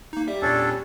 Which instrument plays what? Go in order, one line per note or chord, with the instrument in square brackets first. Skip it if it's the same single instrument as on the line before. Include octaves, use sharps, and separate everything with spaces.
[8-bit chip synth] A#3 D#4
[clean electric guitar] G3 [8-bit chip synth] E5
[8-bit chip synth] E2 A#2 [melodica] C#4 D4 A4